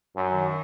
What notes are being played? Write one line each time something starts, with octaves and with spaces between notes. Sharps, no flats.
F#2
D#3